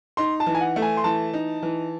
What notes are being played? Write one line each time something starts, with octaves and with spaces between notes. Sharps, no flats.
D#4 C6
A5
E3
G#5
F#5
A3
G#5
C6
E3 A5
D#4
E3